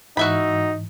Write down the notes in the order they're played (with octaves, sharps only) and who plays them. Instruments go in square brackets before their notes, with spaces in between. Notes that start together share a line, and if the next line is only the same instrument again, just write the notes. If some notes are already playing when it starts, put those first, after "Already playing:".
[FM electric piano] G#2 E3 [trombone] D#4 [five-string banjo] F#4 E5 B5